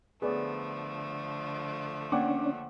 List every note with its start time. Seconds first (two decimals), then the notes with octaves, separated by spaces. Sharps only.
0.22 D3 F3 A3 B3 G#4 C#5 D5
2.12 A#3 C#4 D4 C#5 D5 F#5 G5 D6